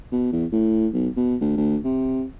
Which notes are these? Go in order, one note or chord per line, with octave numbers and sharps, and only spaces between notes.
B2
E2
A2
B1
B2
D2
D2
C3